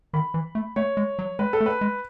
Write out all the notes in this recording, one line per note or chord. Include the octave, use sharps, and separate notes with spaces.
D#3 B5
E3
A3
A3 C#5
G#3
F#3
G#3 B4
A4
A3
B4
G#3